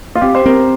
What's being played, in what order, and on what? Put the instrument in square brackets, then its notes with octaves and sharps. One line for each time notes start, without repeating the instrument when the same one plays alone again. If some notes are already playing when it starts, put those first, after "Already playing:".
[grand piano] F4
[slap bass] C4 [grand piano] G4
[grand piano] C5
[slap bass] C4 [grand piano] A#4